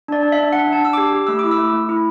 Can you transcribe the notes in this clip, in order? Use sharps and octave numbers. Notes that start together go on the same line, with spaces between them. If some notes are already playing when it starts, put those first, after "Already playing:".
D4 D5
D4
E5
D4
D4 F#5
D4
A5
D4 E6
D6
G4
G4
A3 E6
E4 D6
E6
A3
A3
E4